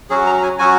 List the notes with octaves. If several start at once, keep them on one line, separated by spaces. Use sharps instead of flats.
F#3 C#4 F#4 G#4
A#5
A#5
G#5
F#3 C#4 F#4 G#5